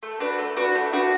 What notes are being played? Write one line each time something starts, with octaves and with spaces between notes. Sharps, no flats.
A3
D4 F#4 B4
A3
D4 F#4 B4
A3
D4 F#4 B4